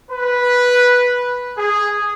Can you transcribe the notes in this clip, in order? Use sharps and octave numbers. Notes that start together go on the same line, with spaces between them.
B4
G#4